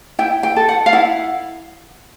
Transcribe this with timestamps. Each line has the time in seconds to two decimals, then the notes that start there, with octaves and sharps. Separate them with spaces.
0.19 E4 G5
0.43 G5
0.56 A4
0.69 F#5
0.86 F5
0.93 E4 F#5